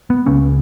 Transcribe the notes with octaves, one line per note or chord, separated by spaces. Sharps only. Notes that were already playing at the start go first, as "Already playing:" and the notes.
B3
C#2 C#3 C#4